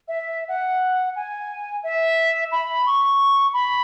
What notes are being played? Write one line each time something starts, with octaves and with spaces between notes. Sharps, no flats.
E5
F#5
G#5
E5
B5
C#6
B5